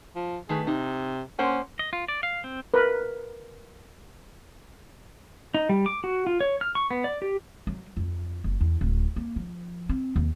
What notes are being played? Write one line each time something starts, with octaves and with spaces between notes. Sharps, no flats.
F3
D#3 A3 G#4 B4
C3 D#4
A#3 C#4 C5 F#5
D#5
F4
D5
F5
C4
A#4 B4
D#4
G3
D6
F#4
F4
C#5
F6
C#6
B3
D5
G4
F#3
F2
F#1
E2
D1
A#3
F3
C4
D#2